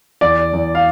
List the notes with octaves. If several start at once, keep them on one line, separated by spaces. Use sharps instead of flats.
E2 D5
E2
F5